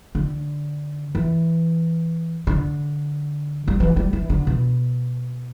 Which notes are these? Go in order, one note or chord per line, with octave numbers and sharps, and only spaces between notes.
D3
E3
D3
G3
E3
G3
E3
D3
B2